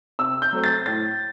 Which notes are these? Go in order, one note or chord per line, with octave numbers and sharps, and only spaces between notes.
C3 E6
G6
F#3 A3 C4
A6
A2 A6